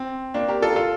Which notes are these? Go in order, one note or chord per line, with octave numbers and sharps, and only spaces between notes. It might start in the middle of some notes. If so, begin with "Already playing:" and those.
Already playing: C4
A#3 D4
G4 A#4
F4 A4
F4 A4